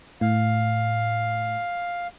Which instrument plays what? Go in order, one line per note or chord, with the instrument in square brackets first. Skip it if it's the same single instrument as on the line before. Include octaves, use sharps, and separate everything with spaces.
[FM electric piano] A2 [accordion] F5